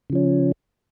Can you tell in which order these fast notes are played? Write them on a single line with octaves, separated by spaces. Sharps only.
C#3 F3 C#4